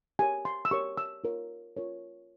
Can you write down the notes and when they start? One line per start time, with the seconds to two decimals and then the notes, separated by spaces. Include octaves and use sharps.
0.19 G4 A#4 C#5 G#5
0.45 C6
0.65 E6
0.71 G4 A#4 C#5 C#6
0.97 E6
1.24 F4 A#4 C#5
1.77 F4 A#4 C#5